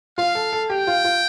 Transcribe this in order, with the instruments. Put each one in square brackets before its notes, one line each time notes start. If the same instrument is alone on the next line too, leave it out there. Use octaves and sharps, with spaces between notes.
[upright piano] F4 [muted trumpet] F5
[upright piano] A4
A4
[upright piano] G4 [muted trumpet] G5
[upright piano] F4
F4